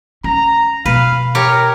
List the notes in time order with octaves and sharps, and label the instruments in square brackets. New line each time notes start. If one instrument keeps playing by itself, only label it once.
[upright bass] C#4 [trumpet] A#5
[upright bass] B2 [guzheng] B4 [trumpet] F5
[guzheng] G4 C#5 [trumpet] A#4